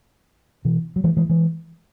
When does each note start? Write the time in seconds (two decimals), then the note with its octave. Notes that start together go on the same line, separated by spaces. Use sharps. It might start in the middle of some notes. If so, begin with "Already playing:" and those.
0.65 B2 E3
0.96 F#3
1.04 E3 G#3
1.17 E3 G#3
1.29 E3 G#3